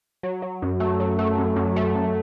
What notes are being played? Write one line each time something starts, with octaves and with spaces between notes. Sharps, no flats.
F#3
F#3
F#2
A3
F#3
A3
F#2
F#2
A3
F#2